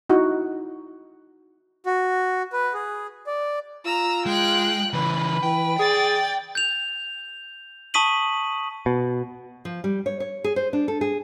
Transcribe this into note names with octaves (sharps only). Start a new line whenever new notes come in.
D#4 E4 F#4
F#4
B4
G#4
D5
F4 A#5 E6
G#3 G5 F#6
C#3 E3 B4
E3 G5
G#4 D5 A6
G6 F7
A5 C#6 D#6 B6 D#7 F#7
B2
F3
G3
C#5
C#5
G#4
C5
D4
A4
G#4